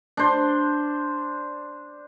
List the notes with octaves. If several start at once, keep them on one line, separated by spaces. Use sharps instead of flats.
D4 C5